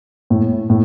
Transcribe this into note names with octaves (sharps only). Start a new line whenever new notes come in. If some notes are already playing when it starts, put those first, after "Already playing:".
A2
A2